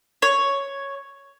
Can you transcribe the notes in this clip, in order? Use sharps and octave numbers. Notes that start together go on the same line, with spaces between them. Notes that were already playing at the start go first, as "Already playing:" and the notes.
C#5